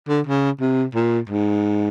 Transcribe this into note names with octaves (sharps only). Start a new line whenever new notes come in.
D3
C#3
C3
A#2
G#2